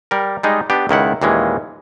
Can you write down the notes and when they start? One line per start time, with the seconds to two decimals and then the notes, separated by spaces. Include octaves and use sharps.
0.11 G3 A#4
0.43 G3 G#3 D#4
0.70 B3 D4 G4
0.89 C#2 D#3 E4 F#5
1.22 D#2 A#2 E3 G#3 C#4